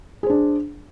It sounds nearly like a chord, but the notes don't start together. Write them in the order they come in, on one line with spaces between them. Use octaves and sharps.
G#4 C5 D4